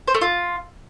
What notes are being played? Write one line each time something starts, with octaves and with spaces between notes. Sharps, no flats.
C5
A3
F4